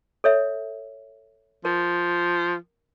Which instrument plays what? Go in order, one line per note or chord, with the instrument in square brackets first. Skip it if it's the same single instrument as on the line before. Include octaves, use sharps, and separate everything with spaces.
[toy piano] A4 C#5 E5
[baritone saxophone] F3 [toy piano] A#4